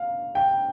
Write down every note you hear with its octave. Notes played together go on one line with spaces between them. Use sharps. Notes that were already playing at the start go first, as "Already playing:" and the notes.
Already playing: F5
G5